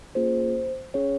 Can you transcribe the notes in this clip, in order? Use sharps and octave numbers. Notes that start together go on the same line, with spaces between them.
A#3 C#4 F4 G#4 C5
C#4 G#4 C#5